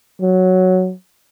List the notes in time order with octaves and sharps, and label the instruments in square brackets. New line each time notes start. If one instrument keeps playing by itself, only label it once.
[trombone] F#3